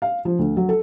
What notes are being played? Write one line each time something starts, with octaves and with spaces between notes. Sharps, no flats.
F5
F3
D2
F#3
A4